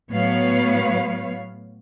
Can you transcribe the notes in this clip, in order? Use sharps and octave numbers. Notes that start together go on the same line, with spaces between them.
A2 F#3 B3 B4 C#5 F5